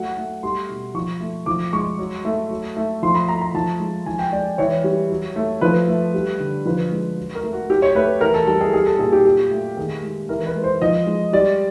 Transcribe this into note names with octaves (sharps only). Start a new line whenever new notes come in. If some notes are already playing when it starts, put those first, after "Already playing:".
Already playing: F#3 A3 F#5
A3
G3 C6
B2
F3 C#6
A3
F3 D6
G#3 C#6
F#3
A3
F#3
A3
F3 C6
B5
A3 A#5
A#5
F3 A5
G#3
F3 G#5
G5
G#3 D5
E3 C#5
G3
F#3
A3
F3 B4
A3
G3
D3
F3 B4
G#3
F#3
A#4
A3
F#4
F#3 G4
C#5
A3 B4
E3 A#4
A4
G3 A4
G#4
G3 G#4
A4
A#2 G#4
G4
F#3 G4
A3
D#3 G#4
G#3
E3 A#4
B4
G#3
C5
F3 D#5
G#3
G3 D5